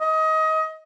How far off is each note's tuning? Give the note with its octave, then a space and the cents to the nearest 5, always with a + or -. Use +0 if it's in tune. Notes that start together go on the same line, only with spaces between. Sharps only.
D#5 +25